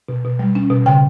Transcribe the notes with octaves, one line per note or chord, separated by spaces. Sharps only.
B2
B2
G3
C#4
B2
C#3 G5